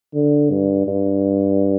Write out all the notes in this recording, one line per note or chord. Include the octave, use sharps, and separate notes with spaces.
D3
G2
G2